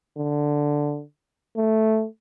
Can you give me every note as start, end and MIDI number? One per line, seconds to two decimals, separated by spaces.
0.18 1.03 50
1.57 2.06 57